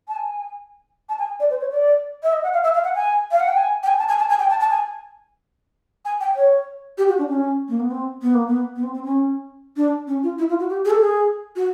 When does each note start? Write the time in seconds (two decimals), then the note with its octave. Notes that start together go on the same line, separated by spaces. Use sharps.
0.08 A5
0.16 G#5
1.09 A5
1.19 G#5
1.40 D5
1.50 C5
1.61 C#5
1.71 D5
2.23 E5
2.33 D#5
2.43 F#5
2.53 F5
2.63 E5
2.74 F5
2.84 F#5
2.95 G#5
3.31 F5
3.40 F#5
3.48 G5
3.57 G#5
3.83 G5
3.88 G#5
3.98 A5
4.09 G#5
4.19 A5
4.29 G#5
4.39 G5
4.50 A5
4.60 A5
4.70 G#5
6.05 G#5
6.20 G5
6.36 C#5
6.98 G4
7.09 F#4
7.19 D4
7.29 C#4
7.69 A#3
7.80 B3
7.91 C4
8.22 B3
8.34 A#3
8.47 B3
8.76 B3
8.84 C4
8.94 C4
9.04 C#4
9.76 D4
10.08 C#4
10.23 F4
10.38 E4
10.49 F4
10.60 F#4
10.70 G4
10.85 G#4
10.90 A4
11.01 G#4
11.56 F#4